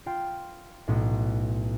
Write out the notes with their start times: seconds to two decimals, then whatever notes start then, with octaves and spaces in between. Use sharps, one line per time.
0.06 F4 G5
0.88 B1 A2